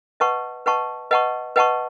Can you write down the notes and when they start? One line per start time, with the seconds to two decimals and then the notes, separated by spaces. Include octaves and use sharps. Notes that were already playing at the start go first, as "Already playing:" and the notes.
0.20 B4 D#5 F#5 A5 C#6
0.66 B4 D#5 F#5 A5 C#6
1.11 B4 D#5 F#5 A5 C#6
1.56 B4 D#5 F#5 A5 C#6